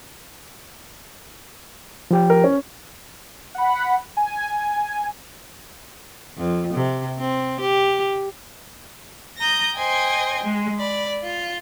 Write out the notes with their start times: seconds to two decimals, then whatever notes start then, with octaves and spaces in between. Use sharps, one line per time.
2.11 F3 G4 G5
2.30 A#4
2.44 C#4
3.55 F#5 B5
4.17 G#5
6.38 F2
6.74 C3
7.19 C4
7.61 G4
9.38 A#5 D#6 G6 A#6
9.76 C5 D#5 G5 G#5
10.44 G#3
10.78 D5 B5
11.24 F4